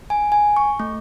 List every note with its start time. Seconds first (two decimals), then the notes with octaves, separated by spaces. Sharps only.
0.10 G#5
0.32 G#5
0.57 C#6
0.80 A3